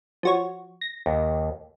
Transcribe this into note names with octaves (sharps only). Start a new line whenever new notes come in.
F3 F#4 C#5
A#6
D#2